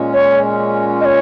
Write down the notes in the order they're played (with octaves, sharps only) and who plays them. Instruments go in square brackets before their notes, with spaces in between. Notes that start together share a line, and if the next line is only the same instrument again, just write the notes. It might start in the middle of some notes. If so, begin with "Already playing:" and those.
Already playing: [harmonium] A#2 G#3 C#4
[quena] C#5
D#5
C#5